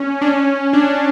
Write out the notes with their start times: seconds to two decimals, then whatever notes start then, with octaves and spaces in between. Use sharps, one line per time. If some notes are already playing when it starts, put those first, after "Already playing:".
Already playing: C#4
0.21 D4
0.27 C#4
0.73 D4